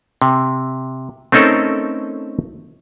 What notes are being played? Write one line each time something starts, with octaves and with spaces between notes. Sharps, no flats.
C3
A3 C4 C#4 D#4 A4 A#4